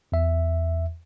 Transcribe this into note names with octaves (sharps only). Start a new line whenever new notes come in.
E2 E5